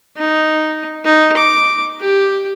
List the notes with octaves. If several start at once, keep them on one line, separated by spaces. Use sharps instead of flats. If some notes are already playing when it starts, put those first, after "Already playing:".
D#4
D#4
D6
G4